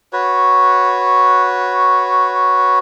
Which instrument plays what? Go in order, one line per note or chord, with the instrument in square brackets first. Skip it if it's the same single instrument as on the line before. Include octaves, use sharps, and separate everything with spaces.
[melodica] F#4 B4 C#5